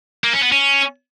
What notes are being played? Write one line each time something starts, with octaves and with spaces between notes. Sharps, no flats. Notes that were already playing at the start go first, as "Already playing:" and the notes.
A#3
C#4
B3
C#4